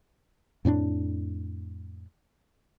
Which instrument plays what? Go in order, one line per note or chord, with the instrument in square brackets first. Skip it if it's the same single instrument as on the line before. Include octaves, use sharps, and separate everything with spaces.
[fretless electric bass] F2 A2 C#4 D4